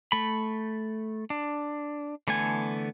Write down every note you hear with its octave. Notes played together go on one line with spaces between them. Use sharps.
A3 B5
D4
D3 E3 A3 B3 G#5